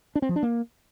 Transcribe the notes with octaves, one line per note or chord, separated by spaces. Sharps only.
D4
C4
F3
D4
A#3